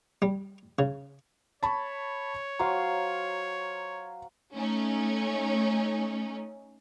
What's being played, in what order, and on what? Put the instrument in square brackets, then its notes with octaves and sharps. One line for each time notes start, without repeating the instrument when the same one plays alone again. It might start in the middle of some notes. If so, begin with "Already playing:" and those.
[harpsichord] G3
C#3
[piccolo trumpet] C#5 [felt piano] A5 B5 C#6
[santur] F#3 C5 F5 [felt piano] C6
[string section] A3 C#4 D#4